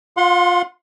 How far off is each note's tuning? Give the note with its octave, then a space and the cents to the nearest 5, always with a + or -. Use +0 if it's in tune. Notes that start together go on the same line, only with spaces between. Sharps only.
F4 +15 F#5 -35 C6 +0